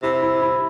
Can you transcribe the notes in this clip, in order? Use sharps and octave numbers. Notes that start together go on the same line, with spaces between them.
C3 E4
E4
E4